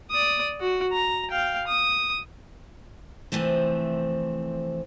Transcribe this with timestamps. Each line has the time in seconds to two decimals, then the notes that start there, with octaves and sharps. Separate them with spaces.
0.11 D5 D#6
0.61 F#4
0.93 A#5
1.31 F5 G5
1.68 D#6
3.32 C3 E3 F3 A3 C4